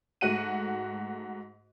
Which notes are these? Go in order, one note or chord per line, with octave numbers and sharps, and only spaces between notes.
G#2 A3 F#4 F#5 D#7